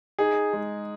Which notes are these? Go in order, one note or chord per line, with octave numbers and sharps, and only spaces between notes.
D#4 G#4
G#3